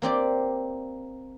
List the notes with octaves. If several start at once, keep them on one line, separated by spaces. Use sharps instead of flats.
A#3 C4 G4 D5